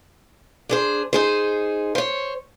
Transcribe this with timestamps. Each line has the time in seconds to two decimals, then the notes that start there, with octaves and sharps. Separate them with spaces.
0.69 D4 G#4 C5
1.13 D#4 G#4 C5
1.95 C5 C#5